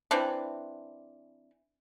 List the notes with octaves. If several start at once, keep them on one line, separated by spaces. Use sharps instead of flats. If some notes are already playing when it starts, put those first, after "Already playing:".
E3 C4 D4